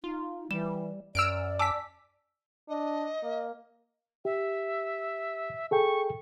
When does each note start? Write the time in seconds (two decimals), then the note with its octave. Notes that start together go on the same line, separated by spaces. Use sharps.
0.04 D#4 F4
0.51 E3 G3 E7
1.15 F#2 D5 E6 F6 D7
1.59 G#5 A5 D6 E6 B6
2.69 D4 D#5
3.23 A#3
4.25 G4 E5
5.71 G#4 A4 G5 C#6